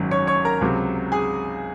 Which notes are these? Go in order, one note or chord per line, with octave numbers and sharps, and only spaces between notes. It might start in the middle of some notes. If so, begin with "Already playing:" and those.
Already playing: G#1 F#2 D#3 F#3
C#5 C#6
C#5 C#6
A#4 A#5
C#2 C3 F#3
G#4 G#5